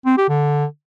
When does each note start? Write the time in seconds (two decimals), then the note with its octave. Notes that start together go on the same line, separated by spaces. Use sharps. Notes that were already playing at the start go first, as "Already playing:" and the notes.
0.06 C4
0.17 G4
0.29 D3